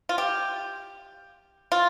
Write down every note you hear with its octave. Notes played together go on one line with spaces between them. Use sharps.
F4
G4
F4